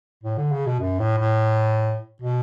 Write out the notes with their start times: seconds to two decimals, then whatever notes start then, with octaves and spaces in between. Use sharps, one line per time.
0.23 A2
0.38 D3
0.52 C#3
0.66 B2
0.80 F#2
0.99 A2
1.18 A2
2.22 B2